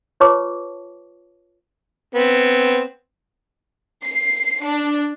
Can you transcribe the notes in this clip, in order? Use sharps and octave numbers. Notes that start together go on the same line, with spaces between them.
F4 B4 C#5 A5 C#6 D6
B3 C4
C7
D4